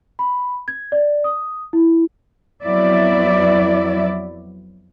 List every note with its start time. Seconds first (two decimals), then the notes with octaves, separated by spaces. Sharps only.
0.19 B5
0.68 G#6
0.92 D5
1.24 D#6
1.73 E4
2.62 F2 F#3 B3 E4 D5 E5